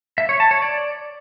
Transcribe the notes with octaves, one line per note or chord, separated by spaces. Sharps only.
E5
C#5
A5
C#5
D5